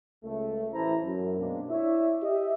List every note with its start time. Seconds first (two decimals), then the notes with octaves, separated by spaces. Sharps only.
0.24 C#2 A3
0.73 A1 E3 E4 C5 A5 A#5
1.03 F#2
1.39 B2 G#3 A#3 C4 D4
1.70 E4 C#5 D5 E5
2.23 G4 D#5 E5